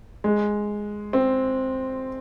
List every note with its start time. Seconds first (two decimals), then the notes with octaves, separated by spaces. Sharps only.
0.24 G#3
1.13 C4